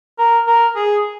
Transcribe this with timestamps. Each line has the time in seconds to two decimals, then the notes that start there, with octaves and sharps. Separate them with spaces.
0.19 A#4
0.47 A#4
0.76 G#4